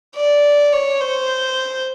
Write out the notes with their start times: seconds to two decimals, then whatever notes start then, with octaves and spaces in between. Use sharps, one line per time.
0.16 D5
0.73 C#5
1.01 C5